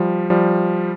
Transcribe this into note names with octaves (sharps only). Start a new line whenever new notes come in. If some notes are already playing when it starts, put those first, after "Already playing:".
Already playing: F3 G3
F3 G3